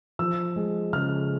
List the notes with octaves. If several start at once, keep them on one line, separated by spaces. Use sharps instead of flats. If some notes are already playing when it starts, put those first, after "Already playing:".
F3 E6
G#3
C#3 F6